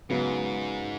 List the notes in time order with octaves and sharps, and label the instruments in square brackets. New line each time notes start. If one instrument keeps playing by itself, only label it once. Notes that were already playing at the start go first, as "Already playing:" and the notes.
[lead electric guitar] G#2 [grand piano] C#3 F#3 B3